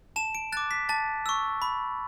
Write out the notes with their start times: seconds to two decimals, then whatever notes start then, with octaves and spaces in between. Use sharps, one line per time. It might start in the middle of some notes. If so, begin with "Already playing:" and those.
0.16 A5 E7
0.35 D7
0.52 D6 F#6 A6
0.71 B6
0.89 A5 A6
1.26 C#6 E6
1.62 B5